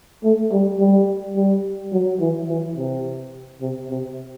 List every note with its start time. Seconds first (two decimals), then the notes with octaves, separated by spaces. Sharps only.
0.24 A3
0.52 G3
0.79 G3
1.36 G3
1.92 F#3
2.20 E3
2.48 E3
2.77 C3
3.61 C3
3.89 C3